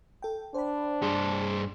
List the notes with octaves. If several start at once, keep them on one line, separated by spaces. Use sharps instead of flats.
A4 G5
D4 C5 G5 B5
G2 G#4 C5